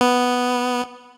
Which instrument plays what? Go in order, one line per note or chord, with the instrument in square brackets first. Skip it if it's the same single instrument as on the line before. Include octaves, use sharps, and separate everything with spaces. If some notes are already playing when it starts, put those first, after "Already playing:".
[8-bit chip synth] B3